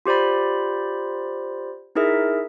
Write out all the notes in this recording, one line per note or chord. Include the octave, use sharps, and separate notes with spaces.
F4 G4 C5 D5 B5
D#4 E4 G#4 A#4 E5